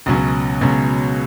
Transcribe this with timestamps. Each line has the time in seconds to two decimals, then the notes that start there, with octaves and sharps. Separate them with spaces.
0.06 C#2 B2 F#3 C#4
0.61 C#2 B2 F#3 C#4